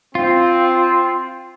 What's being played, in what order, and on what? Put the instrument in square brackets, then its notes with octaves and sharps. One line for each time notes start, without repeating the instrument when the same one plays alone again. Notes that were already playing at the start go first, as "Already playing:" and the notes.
[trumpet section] C4 [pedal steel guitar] F4